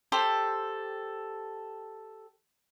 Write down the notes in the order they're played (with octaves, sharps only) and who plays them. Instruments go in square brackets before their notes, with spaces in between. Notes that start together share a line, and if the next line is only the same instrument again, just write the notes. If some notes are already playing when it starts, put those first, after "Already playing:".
[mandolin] G4 A4 C5